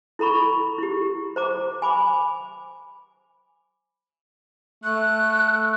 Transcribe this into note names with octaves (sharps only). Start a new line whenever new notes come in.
E4 A4 A#5 B5 C#6
E4 G4
C5 A#5 D6
G#5 B5 D6
A3 F#6